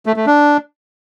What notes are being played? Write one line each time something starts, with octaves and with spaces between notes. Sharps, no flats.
A3
A3
D4